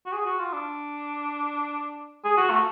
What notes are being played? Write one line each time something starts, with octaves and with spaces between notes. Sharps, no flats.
F#4
G#4
F#4
F4
D4
G#4
F#4
A3